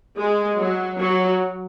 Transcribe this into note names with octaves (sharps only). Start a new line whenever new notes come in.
G#3
F#3
F#3